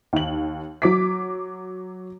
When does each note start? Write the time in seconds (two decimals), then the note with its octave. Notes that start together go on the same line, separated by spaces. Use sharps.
0.13 D#2 F#7
0.82 F#3 D6 B6